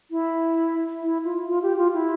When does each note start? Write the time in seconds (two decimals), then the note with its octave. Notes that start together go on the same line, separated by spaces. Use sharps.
0.11 E4
1.02 E4
1.24 F4
1.48 F4
1.63 G4
1.77 F4
1.94 E4